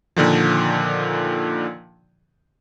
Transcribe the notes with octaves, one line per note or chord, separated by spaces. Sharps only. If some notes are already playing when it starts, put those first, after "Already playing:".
A#2 D3 D#3 F3